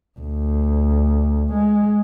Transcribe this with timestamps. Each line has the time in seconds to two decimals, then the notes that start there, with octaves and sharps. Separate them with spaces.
0.19 D2
1.53 G#3